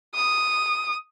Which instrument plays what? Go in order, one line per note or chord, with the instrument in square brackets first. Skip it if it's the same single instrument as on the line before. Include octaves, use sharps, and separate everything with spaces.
[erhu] D#6